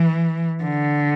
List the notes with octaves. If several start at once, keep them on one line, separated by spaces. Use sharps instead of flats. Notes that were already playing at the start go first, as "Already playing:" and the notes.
Already playing: E3
D3